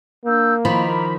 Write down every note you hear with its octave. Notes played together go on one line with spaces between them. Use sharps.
A#3 D4 E6 G6
D#3 F3 D#5 A#5 B5 D6